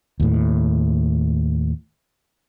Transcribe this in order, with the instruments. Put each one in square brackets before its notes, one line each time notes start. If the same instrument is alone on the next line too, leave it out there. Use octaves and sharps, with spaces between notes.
[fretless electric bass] D#2 A2